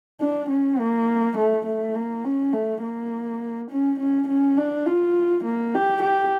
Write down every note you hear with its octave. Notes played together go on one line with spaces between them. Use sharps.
D4
C#4
A#3
A3
A3
A#3
C#4
A3
A#3
C#4
C#4
C#4
D4
F4
A#3
G4
G4